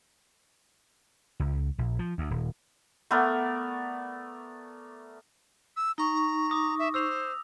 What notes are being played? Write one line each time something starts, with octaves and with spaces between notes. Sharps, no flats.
C#2
A#1
F3
D2
D#1
A3 B3 A#4 D5
E6
D#4 A#5 C#6
D6 D#6 A#6
E5
C5 E6 F7